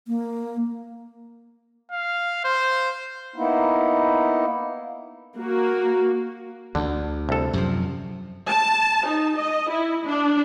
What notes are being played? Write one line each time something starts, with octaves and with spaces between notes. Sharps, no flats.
A#3
F5
C5
A#3 B3 D#4 E4
A#3 F#4
D2 D3
C2 A4
F#2 C3 F3
A5
D#4
D#5
E4
D4